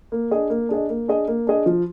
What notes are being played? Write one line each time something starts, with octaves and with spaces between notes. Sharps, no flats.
A#3
D4 G#4 D#5
A#3
D4 G#4 D#5
A#3
D4 G#4 D#5
A#3
D4 G#4 D#5
F3